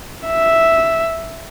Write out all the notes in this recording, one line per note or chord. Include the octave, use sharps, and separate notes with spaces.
E5